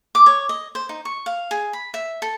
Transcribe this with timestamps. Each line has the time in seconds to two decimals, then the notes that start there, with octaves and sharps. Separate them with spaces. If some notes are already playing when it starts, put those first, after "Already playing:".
0.15 D6
0.26 C#5
0.49 D#5
0.75 C5
0.89 D#4
1.05 C#6
1.26 F5
1.51 G#4
1.73 B5
1.94 E5
2.22 A4